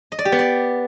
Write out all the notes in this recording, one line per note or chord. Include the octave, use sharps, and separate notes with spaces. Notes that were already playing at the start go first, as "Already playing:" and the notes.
D#5
D5
G4
B3
D5